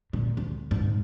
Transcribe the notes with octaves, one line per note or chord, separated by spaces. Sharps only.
A#2
D2
A#1 G#2